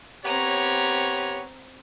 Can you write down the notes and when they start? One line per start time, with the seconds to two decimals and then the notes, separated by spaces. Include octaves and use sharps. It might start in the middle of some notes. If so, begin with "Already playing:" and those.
0.25 B3 C4 G4 C#5 A#5